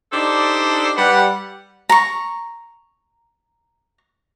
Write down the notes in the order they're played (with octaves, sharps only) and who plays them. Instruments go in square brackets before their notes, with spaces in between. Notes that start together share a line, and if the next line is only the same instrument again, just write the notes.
[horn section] D4 D#4 G4 A4 C5 D5
G3 B4 F#5
[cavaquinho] A#5 C#6